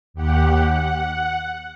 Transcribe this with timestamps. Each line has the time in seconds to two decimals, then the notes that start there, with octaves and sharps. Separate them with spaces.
0.14 D#2 G4 F#5
0.66 F#5